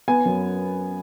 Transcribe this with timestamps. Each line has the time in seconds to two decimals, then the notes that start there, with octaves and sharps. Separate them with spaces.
0.08 B3 G#5
0.25 F#2